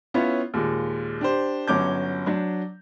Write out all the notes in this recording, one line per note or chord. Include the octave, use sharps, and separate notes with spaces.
B3 C#4 E4 F4 C#5
D#2 A#2 G#3
D4 G4 C5
G1 F#3 C#4 D6 G6
F#3 D4